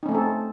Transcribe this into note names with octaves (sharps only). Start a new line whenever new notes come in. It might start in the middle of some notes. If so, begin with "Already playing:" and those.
A3 C4 C#4 D#4 A4